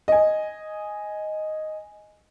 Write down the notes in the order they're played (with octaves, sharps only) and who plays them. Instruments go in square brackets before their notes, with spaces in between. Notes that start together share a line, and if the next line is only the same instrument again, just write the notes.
[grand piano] D#5 G#5